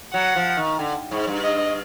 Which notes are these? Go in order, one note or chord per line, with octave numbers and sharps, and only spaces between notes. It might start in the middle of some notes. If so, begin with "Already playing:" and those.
F#3 F#5
F3
D#3
D3
G#2
G2
D#5